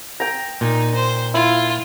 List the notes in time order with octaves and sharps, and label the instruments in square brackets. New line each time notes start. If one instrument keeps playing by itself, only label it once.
[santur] G5 A#5
[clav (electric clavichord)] A#2 [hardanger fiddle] D#4
[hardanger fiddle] C5
[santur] E4 [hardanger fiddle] F4